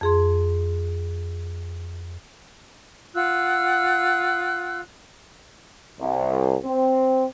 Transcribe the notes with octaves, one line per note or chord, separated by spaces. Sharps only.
F2 G#4 C6
F4 F#5 E6 F#6
C2
C4